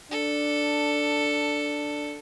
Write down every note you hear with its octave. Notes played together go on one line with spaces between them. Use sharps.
D4 A4